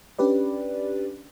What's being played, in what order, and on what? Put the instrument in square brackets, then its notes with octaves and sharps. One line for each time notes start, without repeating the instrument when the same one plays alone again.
[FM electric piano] C#4 D4 G4 B4 D5